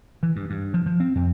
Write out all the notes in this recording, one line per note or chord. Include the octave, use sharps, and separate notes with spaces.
E3
G2
G2
F3
F3
C4
F2